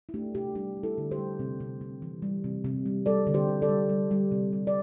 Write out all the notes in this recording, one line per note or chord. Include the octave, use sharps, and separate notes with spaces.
E4
A3 D4 G4
C3 D4 G4
G3 D4 G4
G3
E4 A4
D3
G4 C5
G3
C3
C3
C3
E3
G3
C3
C3
G3
G3 A4 D5
D3
G4 C5
D3
A4 D5
G3
G3
G3
C3
G3
D5